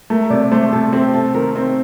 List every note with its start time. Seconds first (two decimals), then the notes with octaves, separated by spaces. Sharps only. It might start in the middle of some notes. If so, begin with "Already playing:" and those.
0.10 A3 A#4
0.30 C3 D5
0.51 A3 C5
0.72 C3 A4
0.92 C4 G4
1.14 C3 A4
1.34 D#3 A#4
1.56 C4